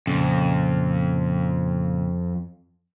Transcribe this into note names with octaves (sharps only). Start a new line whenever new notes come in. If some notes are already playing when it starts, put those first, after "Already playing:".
F2 A#2 C#3